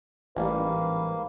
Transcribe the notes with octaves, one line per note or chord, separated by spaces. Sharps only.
A1 G#2 G3 A#3 B4